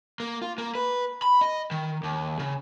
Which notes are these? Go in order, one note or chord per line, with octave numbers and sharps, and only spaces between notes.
A#3
F4
A#3
B4
B5
D#5
D#3
D#2
C#3